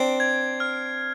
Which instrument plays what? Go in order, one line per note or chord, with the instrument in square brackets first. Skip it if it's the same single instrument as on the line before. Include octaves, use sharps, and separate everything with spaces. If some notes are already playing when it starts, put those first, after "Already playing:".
Already playing: [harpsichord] C4 D4 [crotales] C7
[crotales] G#6
F6